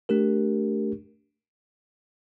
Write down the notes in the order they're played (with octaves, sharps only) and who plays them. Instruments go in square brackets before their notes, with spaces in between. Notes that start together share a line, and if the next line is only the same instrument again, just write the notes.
[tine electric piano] A3 D4 G4 A#4